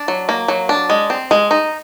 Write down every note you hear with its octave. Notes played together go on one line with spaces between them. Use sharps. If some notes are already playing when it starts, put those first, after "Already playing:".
Already playing: D4
F#3
A#3
F#3
D4
G#3
C4
G#3
D#4